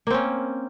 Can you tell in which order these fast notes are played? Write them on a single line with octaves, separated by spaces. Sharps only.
A#3 C4 C#4